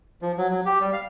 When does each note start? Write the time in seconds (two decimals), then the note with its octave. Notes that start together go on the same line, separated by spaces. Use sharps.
0.22 F3
0.38 F#3
0.50 F#3
0.66 G4
0.80 G3
0.93 F5